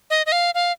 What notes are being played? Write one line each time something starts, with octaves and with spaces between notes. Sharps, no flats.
D#5
D#5
F5
F5